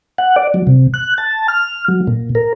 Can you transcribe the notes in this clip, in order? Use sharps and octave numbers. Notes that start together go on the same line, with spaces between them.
F#5
D5
F#3
C3
F#6
A5
F6
F#3
A#2
A#4